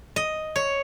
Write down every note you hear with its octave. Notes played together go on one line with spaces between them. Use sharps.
D#5
C#5